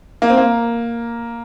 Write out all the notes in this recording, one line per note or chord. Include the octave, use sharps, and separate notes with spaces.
A#3
C4
A#3